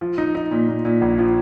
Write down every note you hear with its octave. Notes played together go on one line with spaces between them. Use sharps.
F3
D#4
D#4
A#2
A#2
A#2
A#1
F3